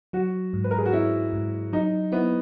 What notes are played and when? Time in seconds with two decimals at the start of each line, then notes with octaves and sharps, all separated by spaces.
0.13 F#3 F#4
0.54 G#2
0.64 B4
0.71 A#4
0.78 G#4
0.86 F#4
0.93 C#4 E4
1.33 G#2
1.73 F#3 D#4
2.12 B3 E4